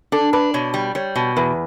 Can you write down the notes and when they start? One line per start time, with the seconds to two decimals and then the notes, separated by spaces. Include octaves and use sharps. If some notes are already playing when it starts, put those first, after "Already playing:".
0.12 D4 A4
0.33 D4 B4
0.54 B2 C#5
0.74 G3
0.95 G3 C#5
1.16 B2
1.36 E2 B4